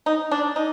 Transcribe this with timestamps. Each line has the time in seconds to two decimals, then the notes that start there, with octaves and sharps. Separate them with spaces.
0.06 D#4
0.31 D4
0.56 D#4